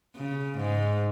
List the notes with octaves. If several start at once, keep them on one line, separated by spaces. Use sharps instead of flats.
C#3
G#2